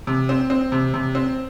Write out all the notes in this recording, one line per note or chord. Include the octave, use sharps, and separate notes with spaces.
C3
C4
C4
C3
C3
C4